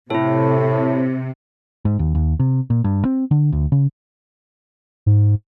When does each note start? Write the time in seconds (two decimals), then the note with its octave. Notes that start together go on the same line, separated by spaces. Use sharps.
0.10 A2 C3 E4 A4
1.85 G#2
1.99 D#2
2.15 D#2
2.40 C3
2.70 A#2
2.84 G2
3.05 C4
3.31 D3
3.52 D2
3.72 C#3
5.06 G#2